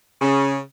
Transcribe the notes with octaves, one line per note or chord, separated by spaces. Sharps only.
C#3